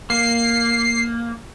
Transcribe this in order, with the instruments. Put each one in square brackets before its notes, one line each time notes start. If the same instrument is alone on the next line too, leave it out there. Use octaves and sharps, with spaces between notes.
[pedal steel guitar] A#3 [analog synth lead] C7